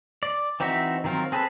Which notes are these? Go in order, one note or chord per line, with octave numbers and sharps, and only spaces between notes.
D5
E3 C4 D#4 F#4 E5
D#3 F#3 C4 F4 A#4
C4 G#4 A4 B4